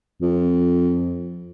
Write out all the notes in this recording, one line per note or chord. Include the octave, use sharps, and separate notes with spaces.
F2